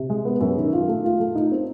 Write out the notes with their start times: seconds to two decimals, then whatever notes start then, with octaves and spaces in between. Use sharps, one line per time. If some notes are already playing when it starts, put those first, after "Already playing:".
Already playing: C3
0.10 G#3
0.25 B3
0.41 F#2
0.57 D#3
0.73 F4
0.88 A3
1.04 F4
1.20 A3
1.35 D#4
1.52 C4